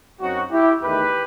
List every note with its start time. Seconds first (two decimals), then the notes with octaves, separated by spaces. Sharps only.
0.21 F#2 F#3 C4 D#4 F#4
0.51 E4 G4
0.82 E2 D#3 A3 D#4 G4 B4